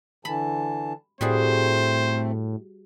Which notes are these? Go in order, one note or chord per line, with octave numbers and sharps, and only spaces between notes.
D3 E3 A5 B5
A2 G3 A3 C4 F#4 G#4 C5